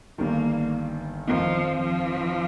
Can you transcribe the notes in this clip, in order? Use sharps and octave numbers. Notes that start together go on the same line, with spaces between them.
G1 G2 D#3 A#3
F2 D#3 F3 C4 D#4
F3